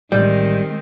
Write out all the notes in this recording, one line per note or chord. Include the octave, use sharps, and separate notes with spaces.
A1 D#3 G3 G#3 C4